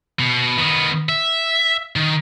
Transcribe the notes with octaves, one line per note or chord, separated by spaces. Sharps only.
B2
D#3 B3
E5
D#3